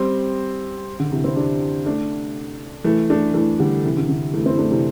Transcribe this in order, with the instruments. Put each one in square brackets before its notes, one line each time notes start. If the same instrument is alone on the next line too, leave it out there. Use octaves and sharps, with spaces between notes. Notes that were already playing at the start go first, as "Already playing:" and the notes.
Already playing: [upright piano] G3 C4
D3
C3 E3
C4 E4
D4 G4
A3 D4
E3 A3
A3 D4
E3 A3
D3 G3
C3 E3
D3
D3
E3 A3
C4 E4
A3 D4
C3 E3